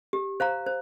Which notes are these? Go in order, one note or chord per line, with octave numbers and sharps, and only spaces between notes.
G4
C5 F5 A#5
C5